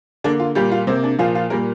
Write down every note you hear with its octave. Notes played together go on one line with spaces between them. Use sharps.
D3 A#3 D4
F4
A#2 G3 A#3 G4
F4
C3 A#3 C4
D4
A#2 F3 A#3 F4
F4
A#2 G3 A#3 A#4